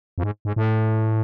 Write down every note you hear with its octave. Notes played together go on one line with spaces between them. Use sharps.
F2
G#2
G#2
A2